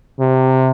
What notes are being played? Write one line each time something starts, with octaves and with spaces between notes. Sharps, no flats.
C3